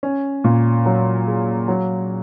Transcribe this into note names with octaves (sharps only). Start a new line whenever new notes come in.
C#4
A#2
F#3
G#4
F#3